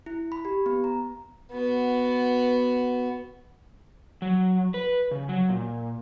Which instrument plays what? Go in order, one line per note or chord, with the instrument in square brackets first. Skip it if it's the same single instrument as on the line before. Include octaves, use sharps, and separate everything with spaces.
[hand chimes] E4
B5
G4
B3
A#5
[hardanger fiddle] B3 F#4
[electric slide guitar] F#3
B4
C#3
F#3
A#2